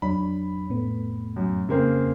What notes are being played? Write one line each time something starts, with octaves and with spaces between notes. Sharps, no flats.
F2 F#3 D4 C#5 B5
A2 A3 B3
F#2
C#3 A#3 C4